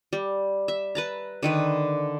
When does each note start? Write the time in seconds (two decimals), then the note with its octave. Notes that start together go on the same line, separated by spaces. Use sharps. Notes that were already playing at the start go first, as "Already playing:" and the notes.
0.13 G3
0.68 E5
0.95 B4 A5 A#5
1.43 D3 D#3 B4